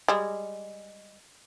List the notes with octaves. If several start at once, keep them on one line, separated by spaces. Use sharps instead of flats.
G3 G#3